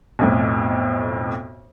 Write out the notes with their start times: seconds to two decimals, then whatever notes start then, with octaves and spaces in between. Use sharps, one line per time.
0.19 B1 F2 A2